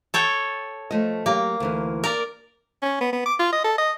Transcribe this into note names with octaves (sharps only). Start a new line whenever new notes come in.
A4 C#5 G5
F3 A3 D#5
F#3 A#3 G4
D2 E3 D#4
A#4 D5
C#4
B3
B3
D6
F4
D#5
A4
D#5